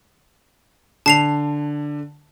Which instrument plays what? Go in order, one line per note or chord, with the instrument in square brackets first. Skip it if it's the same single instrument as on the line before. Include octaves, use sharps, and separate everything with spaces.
[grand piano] D3 [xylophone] A5 C7 F7